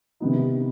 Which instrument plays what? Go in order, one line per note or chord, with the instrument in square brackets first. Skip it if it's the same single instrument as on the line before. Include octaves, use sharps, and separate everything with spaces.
[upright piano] C3 D#3 B3 D#4